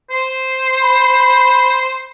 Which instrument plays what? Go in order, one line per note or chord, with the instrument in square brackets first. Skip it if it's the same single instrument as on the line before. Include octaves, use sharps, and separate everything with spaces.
[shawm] C5
[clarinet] B5